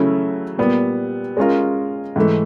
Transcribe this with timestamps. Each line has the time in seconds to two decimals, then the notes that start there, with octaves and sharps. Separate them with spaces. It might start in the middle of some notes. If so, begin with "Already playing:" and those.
Already playing: C#3 F#3 A3 C#4 E4
0.58 A#2 G3 B3
1.37 G#3 C#4 F4 A#4
2.16 G#2 E3 A3